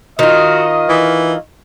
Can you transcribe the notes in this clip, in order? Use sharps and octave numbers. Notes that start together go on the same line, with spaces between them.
D#3 F4 F#4 D#5 D#6
E3